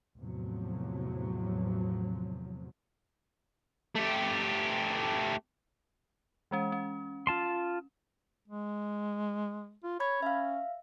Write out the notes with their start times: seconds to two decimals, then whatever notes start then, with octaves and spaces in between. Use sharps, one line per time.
0.19 E2 A2 C3 F3 F#3
3.96 A3 G4
6.51 E3 G#3 C#4
6.72 C#4
7.27 F4 A5 C6
8.48 G#3
9.84 F4
10.00 C#5 B5 G#6
10.22 C#4 E5 F5